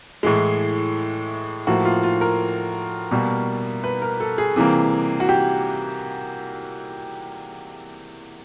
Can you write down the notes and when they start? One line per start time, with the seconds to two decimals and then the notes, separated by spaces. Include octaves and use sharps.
0.23 A2 E3 G#3
1.67 A2 F3 A#3 F#4
1.85 F4
2.03 F4
2.21 A#4
3.11 B2 G3 A#3
3.84 B4
4.02 A#4
4.20 A4
4.38 G#4
4.56 C3 E3 G3 A#3
5.20 F#4
5.29 G4